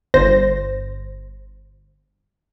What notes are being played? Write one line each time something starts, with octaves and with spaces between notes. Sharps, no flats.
G1 C5 A#6